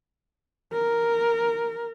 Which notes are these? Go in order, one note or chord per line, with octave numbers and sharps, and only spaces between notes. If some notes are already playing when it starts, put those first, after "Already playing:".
A#4